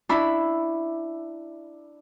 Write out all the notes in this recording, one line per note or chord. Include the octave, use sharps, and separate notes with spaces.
D4 E4 B5